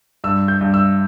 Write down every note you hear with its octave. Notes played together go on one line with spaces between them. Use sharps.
G2 E6
G6
G2
E6